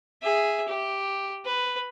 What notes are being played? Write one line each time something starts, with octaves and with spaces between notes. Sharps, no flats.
G#4 E5
G4
B4